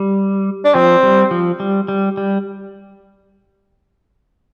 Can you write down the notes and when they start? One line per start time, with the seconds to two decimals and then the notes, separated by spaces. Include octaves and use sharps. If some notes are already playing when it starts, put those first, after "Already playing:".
Already playing: G3
0.65 D4
0.74 F3 C4
1.03 G3
1.31 F3
1.60 G3
1.88 G3
2.17 G3